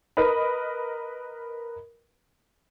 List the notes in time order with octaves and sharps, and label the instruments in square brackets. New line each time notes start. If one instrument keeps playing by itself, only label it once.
[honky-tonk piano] A#4 B4 D#5 B5